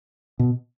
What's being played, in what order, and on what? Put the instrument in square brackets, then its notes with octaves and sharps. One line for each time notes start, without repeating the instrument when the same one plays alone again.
[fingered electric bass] B2